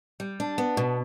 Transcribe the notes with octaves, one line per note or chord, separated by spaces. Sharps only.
G3
D4
B3
B2